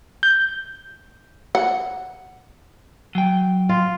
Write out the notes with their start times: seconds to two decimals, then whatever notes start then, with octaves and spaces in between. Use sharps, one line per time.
0.23 G6
1.55 F#5
3.15 F#3 G5
3.69 F4